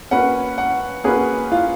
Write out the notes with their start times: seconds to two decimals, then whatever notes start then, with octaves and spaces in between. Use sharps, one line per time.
0.11 A#3 C#4 F#4 B4 F#5
0.58 F#5
1.04 A#3 C#4 F#4 G#4 B4
1.52 F4